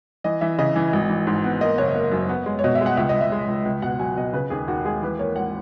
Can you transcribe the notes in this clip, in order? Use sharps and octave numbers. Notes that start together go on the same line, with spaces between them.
E3 D#5
E3 E5
C#3 D#5
E3
G#1
E3
G#2
B3
A#3 D#5
F#1 C#5
A#3
F#2
B3
G#3
C#5
B2 D#5
E5
G#3
F#5
C#2 E5
C#2 D#5
E5
G#3
C#2
C#2
B2 F#5
F#3 G#5
B2 D#5
C#3 B4
D#2 G#4
D#2 F#4
G#3 G#4
E3 B4
A#3 C#5
G#1 F#5